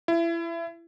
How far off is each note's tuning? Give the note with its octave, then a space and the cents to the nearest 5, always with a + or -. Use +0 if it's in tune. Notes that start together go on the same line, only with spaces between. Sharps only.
E4 +30